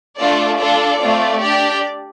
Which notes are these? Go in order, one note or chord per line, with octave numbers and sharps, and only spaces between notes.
A3 D4 F4 A4 D5
D4 F4 A4 D5
A3 C4 F4
D4 G4 D5